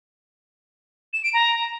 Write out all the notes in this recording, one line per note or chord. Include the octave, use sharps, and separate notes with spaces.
E7
D7
A#5